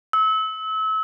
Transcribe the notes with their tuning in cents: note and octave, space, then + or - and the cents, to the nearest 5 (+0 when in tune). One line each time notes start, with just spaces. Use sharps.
E6 -30